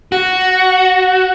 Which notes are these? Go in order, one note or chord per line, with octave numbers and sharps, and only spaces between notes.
F#4